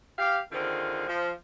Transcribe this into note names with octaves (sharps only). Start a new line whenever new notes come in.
G4 F5
D3 D#3 C4 F4 G#4
F3